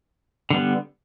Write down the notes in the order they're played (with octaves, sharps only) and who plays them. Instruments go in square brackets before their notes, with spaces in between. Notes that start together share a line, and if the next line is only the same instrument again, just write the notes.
[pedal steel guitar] D3 G3 B3